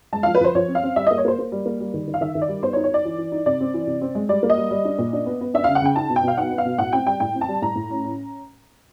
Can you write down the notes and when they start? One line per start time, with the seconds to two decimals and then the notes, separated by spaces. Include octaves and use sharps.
0.13 G#3 A5
0.23 F3 F5
0.35 B4
0.41 F3 C5
0.55 F3 C#5
0.68 C4
0.75 F5
0.83 C4
0.96 G3 E5
1.07 A#3 D#5
1.18 C#5
1.25 A#3 C5
1.39 A#3
1.52 G3
1.66 A#3
1.80 G3
1.94 D#3
2.08 D#3
2.14 F5
2.21 D#3 E5
2.35 D#3
2.41 D5
2.48 G3
2.63 B3 C5
2.73 C#5
2.76 D#4
2.84 C#5
2.91 D#4 D5
3.05 E3
3.18 E3
3.32 D#4
3.46 C3 D5
3.60 C4
3.74 E3
3.87 C3
4.01 C4
4.15 G#3
4.29 G3 D5
4.43 A#3
4.50 D#5
4.58 G3
4.71 G3
4.85 D4
4.99 A#2
5.13 D4
5.26 B3
5.41 B3
5.54 D4 E5
5.64 C#3 F5
5.75 F#5
5.82 C#3 G5
5.96 D#4 A5
6.10 B2
6.16 G5
6.23 B2 F5
6.38 D#4 F#5
6.51 B3
6.58 F5
6.65 B2
6.78 A2 F#5
6.93 C4 G5
7.06 G3 G5
7.20 A2 G5
7.34 C4
7.41 A5
7.48 G3
7.62 A2 A#5
7.76 A2
7.90 C#4
8.04 C#4